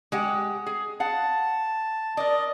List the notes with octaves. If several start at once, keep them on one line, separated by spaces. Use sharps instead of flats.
G#3 G4 F#5
G#4
F5 F#5 A5
A#4 D5 D#5